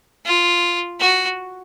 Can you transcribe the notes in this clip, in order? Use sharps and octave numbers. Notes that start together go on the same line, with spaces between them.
F4
F#4